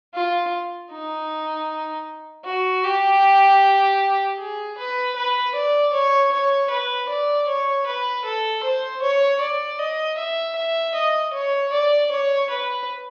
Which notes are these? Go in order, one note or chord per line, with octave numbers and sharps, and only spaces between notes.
F4
D#4
F#4
G4
G#4
B4
B4
D5
C#5
C#5
B4
D5
C#5
B4
A4
C5
C#5
D5
D#5
E5
E5
D#5
C#5
D5
C#5
B4